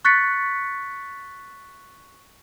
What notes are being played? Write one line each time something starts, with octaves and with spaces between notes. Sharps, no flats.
C#6 F#6 A6 B6 C#7